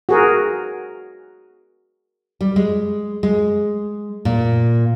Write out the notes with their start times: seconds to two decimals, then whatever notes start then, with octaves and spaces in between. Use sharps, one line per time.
0.09 F#4 G#4 A#4
2.41 G3
2.56 G#3
3.23 G#3
4.25 A#2